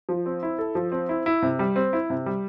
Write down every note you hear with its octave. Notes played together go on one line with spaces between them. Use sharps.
F3
C4
E4
A4
F3
C4
E4
E4
C3
G3
C4
E4
C3
G3